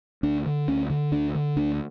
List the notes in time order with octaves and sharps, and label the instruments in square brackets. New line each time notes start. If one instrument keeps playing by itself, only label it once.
[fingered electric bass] D2 D4
D3
D2 C#4
D3
D2 D4
D3
D2 D4